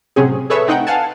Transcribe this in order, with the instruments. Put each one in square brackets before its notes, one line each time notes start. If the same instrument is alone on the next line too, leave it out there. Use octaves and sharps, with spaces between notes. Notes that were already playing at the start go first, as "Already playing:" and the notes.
[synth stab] A2 C3 F#3 C4 C#4 G#4
G#4 A4 B4 C#5 E5
A3 C4 D#4 F#5 G5
F5 F#5 G#5 A5